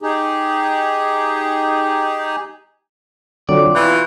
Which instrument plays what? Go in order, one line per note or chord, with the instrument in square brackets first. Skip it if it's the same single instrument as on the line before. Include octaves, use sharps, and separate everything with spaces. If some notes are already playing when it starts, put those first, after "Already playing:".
[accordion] D#4 G4 G#4
[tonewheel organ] D3 F#3 [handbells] C4 F4 [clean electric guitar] D5
[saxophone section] B2 E3 [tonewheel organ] F4 [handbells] F#6